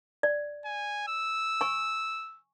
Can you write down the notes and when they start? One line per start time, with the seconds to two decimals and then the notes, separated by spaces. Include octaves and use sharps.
0.23 D5
0.65 G#5
1.08 E6
1.61 G#5 C#6